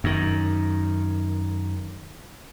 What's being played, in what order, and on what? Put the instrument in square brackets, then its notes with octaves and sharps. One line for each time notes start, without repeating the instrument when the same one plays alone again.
[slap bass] F#2 D#3